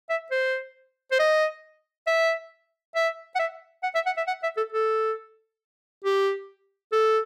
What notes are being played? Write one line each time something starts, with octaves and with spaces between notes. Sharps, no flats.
E5
C5
C5
D#5
E5
E5
F#5
E5
F#5
E5
F#5
E5
F#5
E5
A4
A4
G4
A4